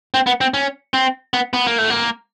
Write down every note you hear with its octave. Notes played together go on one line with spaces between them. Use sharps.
C4
B3
C4
C#4
C4
B3
B3
A#3
A3
A#3